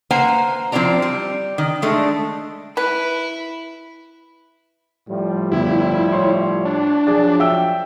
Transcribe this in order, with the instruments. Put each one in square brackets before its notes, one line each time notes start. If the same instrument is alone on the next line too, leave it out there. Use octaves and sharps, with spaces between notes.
[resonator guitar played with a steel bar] A#3 B4 C5 F#5 G#5 A#5
F3 C4 E4 F4 D5 A#5
G3
D#3
G#3 A3 D4
[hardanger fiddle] E4 [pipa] B4
[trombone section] A2 F3 G3
[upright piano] G1 [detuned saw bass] E4
[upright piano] C#5 C6
[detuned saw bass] D4
[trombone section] F3 F#3 [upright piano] G#4 D5
[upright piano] E5 G5 E6